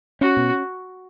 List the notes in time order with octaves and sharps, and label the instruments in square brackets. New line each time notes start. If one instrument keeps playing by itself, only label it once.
[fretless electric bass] C#4 [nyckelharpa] F#4
[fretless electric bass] B2